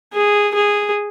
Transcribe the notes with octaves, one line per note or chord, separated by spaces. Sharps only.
G#4
G#4